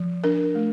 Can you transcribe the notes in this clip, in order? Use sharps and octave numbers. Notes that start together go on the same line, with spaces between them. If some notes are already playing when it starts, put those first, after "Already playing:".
Already playing: F3
D4 A#4
A3